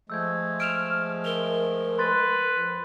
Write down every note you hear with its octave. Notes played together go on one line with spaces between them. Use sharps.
F3 G#3 A3 E6 G6 G#6
F6 D7 E7 F7
A#4 F7 G7
B4 C6 A6
F2